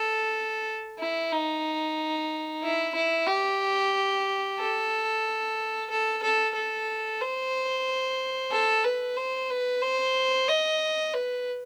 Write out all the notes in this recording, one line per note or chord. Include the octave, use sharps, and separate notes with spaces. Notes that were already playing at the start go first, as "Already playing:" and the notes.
Already playing: A4
E4
D#4
E4
E4
G4
A4
A4
A4
A4
C5
A4
B4
C5
B4
C5
D#5
B4